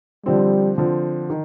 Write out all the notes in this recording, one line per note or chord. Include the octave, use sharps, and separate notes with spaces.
D3 F3 G3 C4
D3 F3 C4
D#3